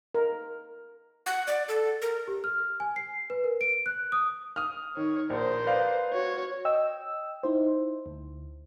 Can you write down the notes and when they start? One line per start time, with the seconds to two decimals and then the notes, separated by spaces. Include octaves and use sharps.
0.14 A#4
1.26 F#5
1.47 D5
1.68 A4
2.02 A#4
2.28 G4
2.44 F6
2.80 G#5
2.96 C7
3.30 B4
3.44 A#4
3.61 D7
3.86 F#6
4.12 D#6
4.56 D#6 F6
4.97 D#3 C#5
5.30 A#1 A#4 C5
5.66 B4 D5 F5
6.13 F#4 C#5
6.65 D#5 G5 E6
7.43 D#4 E4 C5
8.06 D2